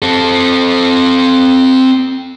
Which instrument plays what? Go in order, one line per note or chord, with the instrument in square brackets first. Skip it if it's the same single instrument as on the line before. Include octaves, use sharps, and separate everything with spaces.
[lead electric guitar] C4 A4